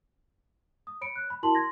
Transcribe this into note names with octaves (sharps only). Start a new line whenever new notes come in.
D#6
C#5 B5 C#7 D7
F#6
B5
E4 F#4 A#4 A5 C6 F#7
C6 G#6 A#6